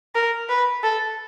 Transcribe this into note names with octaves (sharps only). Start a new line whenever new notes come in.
A#4
B4
A4